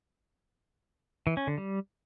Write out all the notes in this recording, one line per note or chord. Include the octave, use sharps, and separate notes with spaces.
E3
C#4
D3
G3